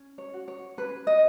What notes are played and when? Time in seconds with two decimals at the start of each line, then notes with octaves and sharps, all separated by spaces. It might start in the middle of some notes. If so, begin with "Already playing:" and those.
Already playing: C#4
0.18 C#5
0.34 F#4
0.48 C#5
0.77 C#4 B4
1.07 D#5